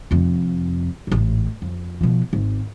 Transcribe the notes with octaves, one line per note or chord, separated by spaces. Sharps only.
F1 F2
A1 G#2
F2
B2 F3
G#1